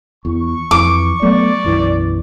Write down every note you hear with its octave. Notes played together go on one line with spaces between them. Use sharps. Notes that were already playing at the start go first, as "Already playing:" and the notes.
E2 C#6
F2 E3 D6
F#3 A3 B3 D5
B1 F#2 E3